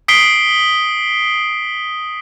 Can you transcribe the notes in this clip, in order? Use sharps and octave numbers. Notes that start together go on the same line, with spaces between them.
D#6 B6 C7 D7 G7